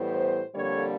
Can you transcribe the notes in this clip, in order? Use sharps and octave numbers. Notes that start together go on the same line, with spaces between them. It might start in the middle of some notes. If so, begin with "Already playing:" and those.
Already playing: A2 E3 G3 B3 C5
F2 D3 G3 A#3 C#5